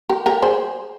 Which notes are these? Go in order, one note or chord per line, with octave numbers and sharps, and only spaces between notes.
G4 A#4
G4 A#4
G#4 C5